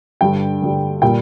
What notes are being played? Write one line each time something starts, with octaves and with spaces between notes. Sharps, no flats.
G2 D3 G3 G5
G2 D3 G3
A#2 G3 A#3 G5